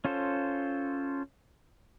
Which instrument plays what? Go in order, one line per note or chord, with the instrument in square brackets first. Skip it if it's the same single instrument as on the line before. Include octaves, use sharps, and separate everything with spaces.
[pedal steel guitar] C#4 F4 A4 C5